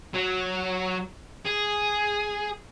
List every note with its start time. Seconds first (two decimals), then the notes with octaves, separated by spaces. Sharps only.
0.14 F#3
1.45 G#4